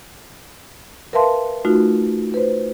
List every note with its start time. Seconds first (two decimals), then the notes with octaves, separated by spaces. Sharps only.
1.13 A#4 B4 E5 F5 A5 C6
1.65 A3 D#4 F4 F#4
2.34 B4 C5